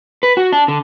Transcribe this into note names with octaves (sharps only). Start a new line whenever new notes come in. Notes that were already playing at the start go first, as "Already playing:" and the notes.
B4
F#4
D4
D3